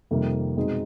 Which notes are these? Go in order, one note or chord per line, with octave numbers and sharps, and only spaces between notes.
F2 C3 D#3 G3 A#3
B2 G#3 C4 D#4 G#4